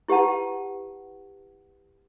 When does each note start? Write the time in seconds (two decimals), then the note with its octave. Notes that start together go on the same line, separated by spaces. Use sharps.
0.08 E4 G4 B4 F#5 A5